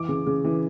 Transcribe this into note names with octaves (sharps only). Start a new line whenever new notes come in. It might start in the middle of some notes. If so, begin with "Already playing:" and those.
Already playing: E3 D6
C#3
C#3
E3